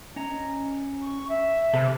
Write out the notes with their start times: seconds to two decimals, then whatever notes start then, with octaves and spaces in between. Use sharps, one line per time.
0.16 C#4 D#5 A#5
1.02 C#6
1.29 E5
1.74 C3 A4 B4 F6